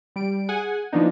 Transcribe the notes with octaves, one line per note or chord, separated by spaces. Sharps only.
G3 D7
G#4 F#5 G#5
E3 F3 A#3 B3 D4 D#4